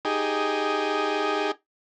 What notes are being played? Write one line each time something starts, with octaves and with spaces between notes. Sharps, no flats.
D#4 G4 G#4